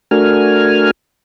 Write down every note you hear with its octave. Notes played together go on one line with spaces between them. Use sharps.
A3 D4 F#4 A#4 G#5 F6